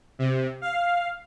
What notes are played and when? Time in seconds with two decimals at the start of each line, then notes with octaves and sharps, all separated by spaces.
0.19 C3
0.62 F5